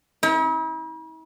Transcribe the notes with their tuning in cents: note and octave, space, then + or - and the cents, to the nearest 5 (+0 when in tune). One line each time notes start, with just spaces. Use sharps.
E4 -45